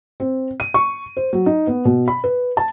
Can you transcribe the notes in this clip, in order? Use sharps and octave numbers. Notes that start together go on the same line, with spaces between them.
C4
D#7
C#6
C5
F#3
D#4
B3
B2
B5
B4
A5